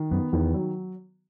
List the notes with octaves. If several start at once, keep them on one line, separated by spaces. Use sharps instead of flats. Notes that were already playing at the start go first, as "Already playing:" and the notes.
Already playing: D#3
F#2 B3
E2 D#3
F#3